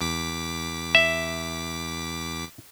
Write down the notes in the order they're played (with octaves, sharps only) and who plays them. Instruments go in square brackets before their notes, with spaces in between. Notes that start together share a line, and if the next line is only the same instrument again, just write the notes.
[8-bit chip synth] E2 D6 B6
[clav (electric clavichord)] E5